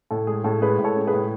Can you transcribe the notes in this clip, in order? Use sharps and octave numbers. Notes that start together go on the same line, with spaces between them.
A2 A4
G#3 G#4
A2 A4
G#3 G#4 B4
A2
A4 C#5
G#3
G#4 B4
A2